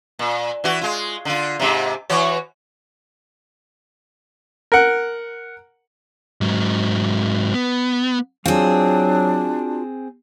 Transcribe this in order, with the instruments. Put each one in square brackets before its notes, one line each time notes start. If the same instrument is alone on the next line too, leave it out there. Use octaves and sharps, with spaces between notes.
[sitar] A#2
E3 F#4
G#3 F4
D3 F4
G#2 C3
E3 F#4 C#5
[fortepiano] A#4 F#5
[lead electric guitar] G#2 F#3
B3
[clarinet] F#3 [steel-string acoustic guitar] C4 G#4 [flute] D4 [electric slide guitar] F4 F#4 F5